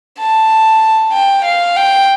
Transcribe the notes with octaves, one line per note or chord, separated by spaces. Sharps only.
A5
G5
F5
G5